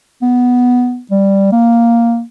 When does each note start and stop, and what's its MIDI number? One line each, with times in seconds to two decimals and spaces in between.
0.22 1.01 59
1.11 1.50 55
1.52 2.23 58